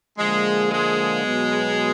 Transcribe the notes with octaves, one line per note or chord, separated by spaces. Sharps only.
D3 F3 G#3 A#3
G#3
B2 F#3 B3